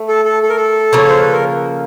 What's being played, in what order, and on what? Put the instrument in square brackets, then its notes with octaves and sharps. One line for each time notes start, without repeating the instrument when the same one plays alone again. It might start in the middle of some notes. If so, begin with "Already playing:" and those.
Already playing: [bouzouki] A3
[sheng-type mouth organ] A4
A4
A4
A#4
A4
[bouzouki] C#3 F3 A#3 [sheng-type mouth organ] C#5
[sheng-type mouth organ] C5
B4
A#4